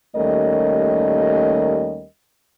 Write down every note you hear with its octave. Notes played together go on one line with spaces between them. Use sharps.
D#2 G3 A3 C#4 A#4 D#5